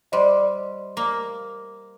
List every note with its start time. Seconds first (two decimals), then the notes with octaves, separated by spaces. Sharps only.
0.12 G3 C5 D#5 C6
0.97 A#3